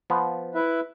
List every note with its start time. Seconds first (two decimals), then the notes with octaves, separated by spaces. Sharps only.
0.10 F3 B3
0.55 E4 B4 E5